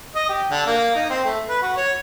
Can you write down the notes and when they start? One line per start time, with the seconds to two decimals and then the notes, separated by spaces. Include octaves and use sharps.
0.15 D#5
0.29 G4
0.50 D3
0.66 A#3
0.95 D#4
1.10 C4
1.25 A3
1.49 B4
1.62 F#4
1.77 C#5